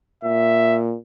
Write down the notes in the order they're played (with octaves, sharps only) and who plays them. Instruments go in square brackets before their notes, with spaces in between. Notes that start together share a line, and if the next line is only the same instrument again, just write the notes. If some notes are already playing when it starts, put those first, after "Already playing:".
[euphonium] A#2 [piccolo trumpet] E5